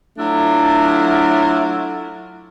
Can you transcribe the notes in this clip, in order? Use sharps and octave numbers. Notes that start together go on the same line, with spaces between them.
F#3 A3 D4 E4 F4